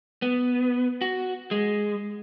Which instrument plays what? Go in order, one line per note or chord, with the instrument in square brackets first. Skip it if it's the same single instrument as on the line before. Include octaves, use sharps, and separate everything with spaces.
[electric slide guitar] B3
F#4
G#3